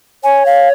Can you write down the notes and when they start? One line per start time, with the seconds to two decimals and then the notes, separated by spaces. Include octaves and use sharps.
0.24 C#5 G#5
0.46 F5